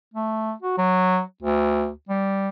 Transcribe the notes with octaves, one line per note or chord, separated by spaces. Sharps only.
A3
F#4
F#3
D2
G3